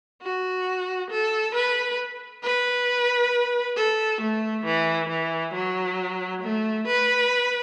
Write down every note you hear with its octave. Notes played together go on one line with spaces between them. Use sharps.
F#4
A4
B4
B4
A4
A3
E3
E3
F#3
A3
B4